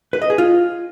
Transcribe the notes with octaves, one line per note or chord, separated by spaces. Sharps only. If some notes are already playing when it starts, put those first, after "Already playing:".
B4
D#5
G#4
F4